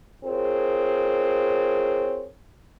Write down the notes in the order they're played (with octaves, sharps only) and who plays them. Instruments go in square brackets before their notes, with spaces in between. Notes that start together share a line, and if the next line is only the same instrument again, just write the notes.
[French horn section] C4 F4 G#4 A#4 C#5